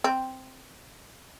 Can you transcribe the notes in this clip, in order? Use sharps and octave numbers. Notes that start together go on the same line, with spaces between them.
C4